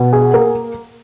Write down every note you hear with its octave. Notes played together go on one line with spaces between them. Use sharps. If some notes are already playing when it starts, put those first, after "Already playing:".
Already playing: B2
G#4
A#3